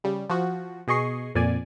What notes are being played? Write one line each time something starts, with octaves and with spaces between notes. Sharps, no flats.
C#3 G3
F3 F#4
B2 G#4 D#5 C#6 C7
F2 A#2 D5 G#5